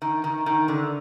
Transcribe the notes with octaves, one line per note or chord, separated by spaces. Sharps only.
D#3
D#3
D#3
D3